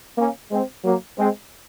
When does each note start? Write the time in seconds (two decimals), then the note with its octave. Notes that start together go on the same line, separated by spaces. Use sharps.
0.18 A#3 C#4
0.51 G#3 C4
0.84 F#3 A#3
1.17 G#3 C4